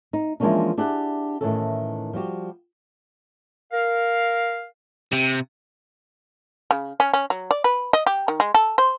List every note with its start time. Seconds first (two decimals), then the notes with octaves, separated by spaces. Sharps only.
0.13 D#4
0.40 E3 F3 G#3 A#3 C#4 D4
0.78 D4 E4 G4 G#4 F#5
1.41 A2 D#3 E3 B3 C#4 A4
2.13 F3 G3 F#4 G4
3.73 A#4 F5
5.12 C3
6.71 C#3
7.00 C#4
7.14 C#4
7.30 F#3
7.51 D5
7.64 B4
7.93 D#5
8.07 G4
8.28 D#3
8.40 G#3
8.54 A4
8.78 C5